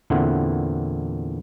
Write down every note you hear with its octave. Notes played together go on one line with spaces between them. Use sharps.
E2 A#2 D3 C4 E4 F#5